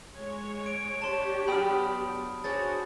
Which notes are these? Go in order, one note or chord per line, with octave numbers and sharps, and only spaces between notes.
G#3 C#5
D7
D4 G4 C#5 A5 C6
F#3 B3 G#4 G5 B5 D#6 F6
D4 F#4 G#4 C5 C#5 A6